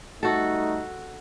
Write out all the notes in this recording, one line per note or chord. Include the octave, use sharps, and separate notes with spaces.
G3 A3 D#4 F#4 A4